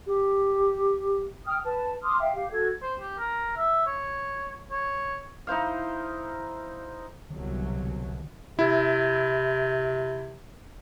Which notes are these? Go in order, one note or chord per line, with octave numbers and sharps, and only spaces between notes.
G4
G5 D#6 F6
B4 A5
C6 D6 D#6 F6
E5 F5 G5
G4 F5
F#4 A4 G#6
C5
G4
A#4
E5
C#5
C#5
D#4 E4 C5 F5
C2 B2 D3 F#3
C3 E4